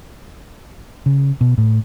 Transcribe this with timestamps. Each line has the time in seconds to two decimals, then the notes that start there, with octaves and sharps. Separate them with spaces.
1.06 C#3
1.41 B2
1.58 A2